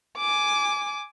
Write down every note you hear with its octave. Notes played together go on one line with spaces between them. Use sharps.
G#5 D6